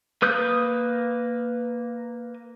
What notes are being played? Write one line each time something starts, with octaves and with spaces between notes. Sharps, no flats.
A#3 B4 D#6 F#6 G6